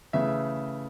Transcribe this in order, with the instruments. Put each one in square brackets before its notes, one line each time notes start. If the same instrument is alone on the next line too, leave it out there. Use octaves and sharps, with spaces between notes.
[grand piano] C#3 E3 A3 E5